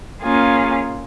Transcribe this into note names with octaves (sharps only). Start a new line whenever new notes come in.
A#3 C#4 F4 G#4